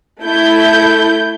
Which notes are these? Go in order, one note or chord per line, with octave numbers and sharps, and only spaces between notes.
A3 E4 G6